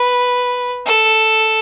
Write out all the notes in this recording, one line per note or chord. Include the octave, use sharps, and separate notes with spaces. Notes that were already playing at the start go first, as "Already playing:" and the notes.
Already playing: B4
A4